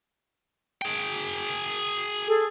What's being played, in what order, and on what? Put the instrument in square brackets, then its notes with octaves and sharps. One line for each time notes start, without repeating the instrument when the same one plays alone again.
[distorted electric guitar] G#4 G5
[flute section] G#4 A4